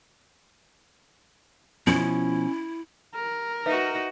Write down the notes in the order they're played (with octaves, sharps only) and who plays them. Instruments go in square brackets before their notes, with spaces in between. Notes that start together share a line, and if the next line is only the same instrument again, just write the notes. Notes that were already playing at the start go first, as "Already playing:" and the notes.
[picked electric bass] B2 F3 [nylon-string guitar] C#4 [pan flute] E4
[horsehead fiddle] A#4
[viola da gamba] D#4 F#4 [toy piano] B4 E5 F5